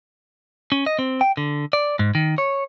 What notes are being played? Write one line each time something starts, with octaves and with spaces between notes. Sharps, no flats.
C#4
D#5
C4
G5
D3
D5
G#2
D#3
C#5